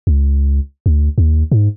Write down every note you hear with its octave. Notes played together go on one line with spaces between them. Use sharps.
C#2
D2
D#2
G#2